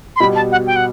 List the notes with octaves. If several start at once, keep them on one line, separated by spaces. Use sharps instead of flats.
C6
B2 G3 B3 B5
A5
F#5
G5
F#5